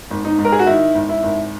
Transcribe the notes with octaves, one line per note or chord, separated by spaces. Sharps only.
G#1
D#4
G#2
A#4
G#4
F#4
D#3 E4
G#1
E4
G#1